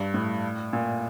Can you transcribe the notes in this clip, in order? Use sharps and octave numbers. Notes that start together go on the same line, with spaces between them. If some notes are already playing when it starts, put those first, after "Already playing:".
Already playing: G2
A2
A#2